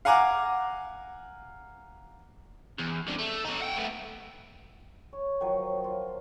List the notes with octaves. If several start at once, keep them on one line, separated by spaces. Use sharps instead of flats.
F5 F#5 G#5 A#5 D6
E2
C2 D3
A3
D#4 F#4
F#5 G5
A3 B3
C#5
D#3 F3 F#3
F4